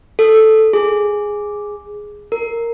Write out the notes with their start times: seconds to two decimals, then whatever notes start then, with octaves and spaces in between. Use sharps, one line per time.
0.19 A4
0.73 G#4
2.32 A#4